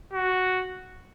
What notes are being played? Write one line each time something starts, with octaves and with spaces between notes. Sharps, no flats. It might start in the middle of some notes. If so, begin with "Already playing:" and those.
F#4